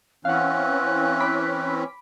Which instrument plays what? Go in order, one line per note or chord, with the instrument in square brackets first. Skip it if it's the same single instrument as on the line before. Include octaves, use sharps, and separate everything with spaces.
[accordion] E3 C4 C#4 [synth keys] F5 F#5 [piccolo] F#6
[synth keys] B5 D6 B6